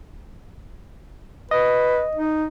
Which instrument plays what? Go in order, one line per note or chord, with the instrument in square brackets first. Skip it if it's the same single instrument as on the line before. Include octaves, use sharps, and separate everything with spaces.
[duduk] B4 [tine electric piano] D#5
[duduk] D#4